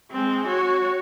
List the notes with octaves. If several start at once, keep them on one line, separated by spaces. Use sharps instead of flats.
G#3 C4
F#4 C#5